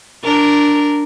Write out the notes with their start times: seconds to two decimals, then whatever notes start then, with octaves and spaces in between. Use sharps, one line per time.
0.24 D4 A#4